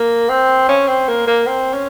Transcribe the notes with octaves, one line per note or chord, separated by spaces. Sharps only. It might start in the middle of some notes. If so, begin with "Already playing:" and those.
Already playing: A#3
C4
C#4
C4
A#3
A#3
C4
C#4